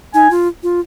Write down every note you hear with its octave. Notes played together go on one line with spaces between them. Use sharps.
D#4 G#5
F4
F4